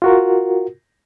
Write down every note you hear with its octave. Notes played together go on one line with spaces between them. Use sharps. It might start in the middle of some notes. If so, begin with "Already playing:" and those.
F4 F#4 A#4